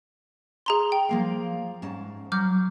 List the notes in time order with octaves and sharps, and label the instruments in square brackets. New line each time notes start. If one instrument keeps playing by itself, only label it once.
[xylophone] G#4 A#5 C6
G5
[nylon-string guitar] F3 A#3 F5
G#2 C#4 A5
[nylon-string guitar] F#3 [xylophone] D6 F6 G6